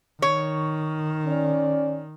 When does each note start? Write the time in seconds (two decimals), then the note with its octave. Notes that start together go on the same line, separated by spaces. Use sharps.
0.22 D#3 C#5
1.26 C#4 D5